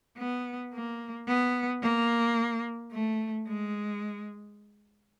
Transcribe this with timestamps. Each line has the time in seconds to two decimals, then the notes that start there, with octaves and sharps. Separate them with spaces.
0.19 B3
0.74 A#3
1.28 B3
1.83 A#3
2.92 A3
3.48 G#3